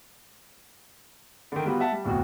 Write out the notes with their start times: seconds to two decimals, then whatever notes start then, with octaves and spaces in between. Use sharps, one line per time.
1.52 D3 D#3
1.65 G3 B3 F4 F#4
1.80 E5 F#5 A5
1.92 G3
2.04 D1 F2 B2 F#4